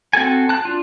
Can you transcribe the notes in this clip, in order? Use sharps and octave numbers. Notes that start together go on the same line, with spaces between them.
C4 F#4 A4 G#5
A5 F#6
D4 F4